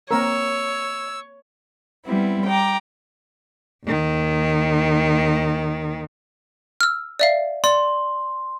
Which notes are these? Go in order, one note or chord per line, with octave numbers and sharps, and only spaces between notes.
A#3 C4 A#4 C#5 E6
G3 B3 C4 E4
G5 A#5 D6
D#2 D#3
E6 F6
D5 E5 F5
D5 C6